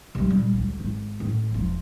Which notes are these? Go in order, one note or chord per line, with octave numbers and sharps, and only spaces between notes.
C3 G3
A#2 G3
D2
G#1
A2
E1 F3